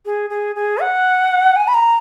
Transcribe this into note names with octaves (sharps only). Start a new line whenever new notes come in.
G#4
G#4
G#4
F#5
G#5
B5
A#5